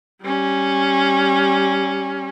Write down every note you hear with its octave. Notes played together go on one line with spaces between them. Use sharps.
G3 C#4